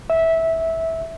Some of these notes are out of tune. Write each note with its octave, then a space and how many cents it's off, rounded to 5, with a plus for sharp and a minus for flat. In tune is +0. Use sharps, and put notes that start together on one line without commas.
E5 -15